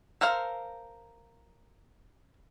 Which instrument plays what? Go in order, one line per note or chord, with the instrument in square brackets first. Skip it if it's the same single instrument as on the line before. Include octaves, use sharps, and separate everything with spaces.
[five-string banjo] A4 A#4 C5 F5